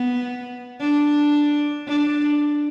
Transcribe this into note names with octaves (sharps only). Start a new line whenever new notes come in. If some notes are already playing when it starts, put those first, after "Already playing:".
Already playing: B3
D4
D4